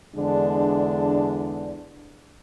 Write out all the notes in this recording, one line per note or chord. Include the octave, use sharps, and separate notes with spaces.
E2 D3 G#3 D4